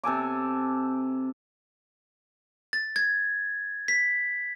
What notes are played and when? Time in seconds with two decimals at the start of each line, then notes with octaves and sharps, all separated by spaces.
0.03 C3 A4 G#5 D6
2.73 A6
2.96 G#6
3.88 B6